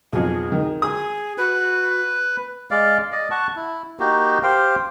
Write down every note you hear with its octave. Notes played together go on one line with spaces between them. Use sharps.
B1 F2 G#4
D#3
G#4 D#6
F#4 B4
G#3 D5 F5
D5 D#5
F#5 A5 C#6
E4
A#3 D#4 F#4 G4
G4 C5 F5 G5